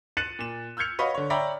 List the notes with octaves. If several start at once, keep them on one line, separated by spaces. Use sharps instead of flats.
F#6 A6 C#7 D#7 E7 F#7
A#2 E7
E6 F6 G6 G#6 C#7 F7
F#4 B4 C#5 D#5 F5
D3 C#5
C#5 D5 E5 G5 A#5 B5